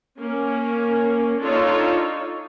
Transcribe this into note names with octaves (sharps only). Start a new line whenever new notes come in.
A#3 C#4
D4 D#4 F4 A4 C#5